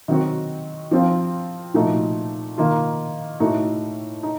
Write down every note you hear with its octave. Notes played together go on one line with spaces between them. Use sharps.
D#3 F#3 C4 F#4
F3 C4 F4
A#2 F3 A3 D#4 F#4
D#3 A#3 F4
A2 A3 D#4 F#4
D#4